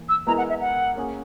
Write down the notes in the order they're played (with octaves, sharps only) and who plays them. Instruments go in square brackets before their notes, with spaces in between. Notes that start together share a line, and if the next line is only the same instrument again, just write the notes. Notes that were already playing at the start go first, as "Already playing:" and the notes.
Already playing: [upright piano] E3 A#3
[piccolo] E6
[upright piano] G#3 B3 E4 A#4 [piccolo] A#5
[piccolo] F#5
E5
F#5
[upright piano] A#3 C#4 G#4